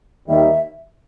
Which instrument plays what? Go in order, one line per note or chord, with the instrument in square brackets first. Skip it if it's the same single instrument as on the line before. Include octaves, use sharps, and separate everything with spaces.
[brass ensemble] D#2 D#3 G3 [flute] E5